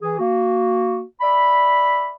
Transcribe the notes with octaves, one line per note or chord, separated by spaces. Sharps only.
E3 G#4
A#3 F#4
D5 E5 B5